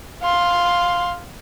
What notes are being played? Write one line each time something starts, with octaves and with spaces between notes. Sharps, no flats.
F5 C6